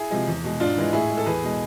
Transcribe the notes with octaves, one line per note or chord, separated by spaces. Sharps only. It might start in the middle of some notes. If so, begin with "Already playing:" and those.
Already playing: E4 G#4
C3 F3 G#3
E2
B2 G#3
G#2 D4 F4
E3 G#3
A2 E4 G#4
G#3
A4
E2 G#4 B4
B2 G#3